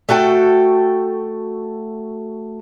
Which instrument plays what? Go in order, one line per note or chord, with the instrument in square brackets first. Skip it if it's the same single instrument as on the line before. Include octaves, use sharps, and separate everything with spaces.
[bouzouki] A3 F#4 A4 G5